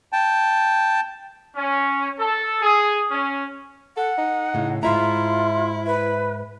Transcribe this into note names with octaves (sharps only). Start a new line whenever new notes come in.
G5 A5
C#4
A4
G#4
C#4
A4 F#5
D#4
A2 C#3
G#2 E4 F4 E5 A#5
B4